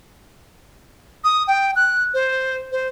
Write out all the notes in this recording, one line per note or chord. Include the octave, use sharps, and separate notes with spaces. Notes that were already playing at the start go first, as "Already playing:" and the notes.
D#6
G5
F#6
C5
C5